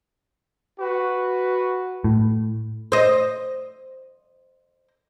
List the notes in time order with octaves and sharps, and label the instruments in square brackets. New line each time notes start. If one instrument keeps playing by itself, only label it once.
[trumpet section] F#4 B4
[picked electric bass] A2
[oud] C5 D#5